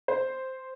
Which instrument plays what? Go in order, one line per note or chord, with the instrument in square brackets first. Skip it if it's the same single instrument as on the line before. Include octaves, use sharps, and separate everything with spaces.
[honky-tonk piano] C5